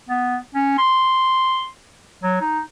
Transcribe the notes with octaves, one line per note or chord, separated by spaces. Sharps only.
B3
C#4
C6
F#3
D#4